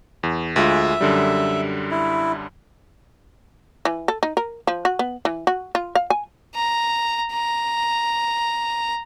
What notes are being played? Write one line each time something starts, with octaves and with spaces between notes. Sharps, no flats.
E2
D2 G#3 F4 E5
F#2 D3 G3
E4
E3
A4
D#4
A#4
F3
F#4
B3
E3
F#4
F4
F5
G#5
A#5
A#5